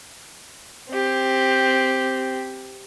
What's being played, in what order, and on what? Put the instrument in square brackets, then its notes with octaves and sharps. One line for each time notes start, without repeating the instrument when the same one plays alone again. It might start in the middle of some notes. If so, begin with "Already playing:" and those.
[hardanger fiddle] C4 G4